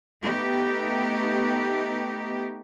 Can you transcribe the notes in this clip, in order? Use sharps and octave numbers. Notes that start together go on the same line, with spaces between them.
A3 B3 D#4 G4